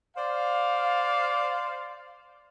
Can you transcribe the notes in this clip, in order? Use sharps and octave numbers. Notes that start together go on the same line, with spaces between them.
C5 D5 F5